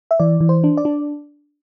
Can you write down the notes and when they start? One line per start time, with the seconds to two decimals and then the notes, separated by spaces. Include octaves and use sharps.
0.11 E5
0.19 E3 D5
0.41 E3
0.49 C5
0.64 D4
0.77 D5
0.85 D4